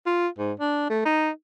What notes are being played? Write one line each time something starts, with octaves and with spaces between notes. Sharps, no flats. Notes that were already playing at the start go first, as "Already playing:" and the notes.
F4
G#2
D4
A3
D#4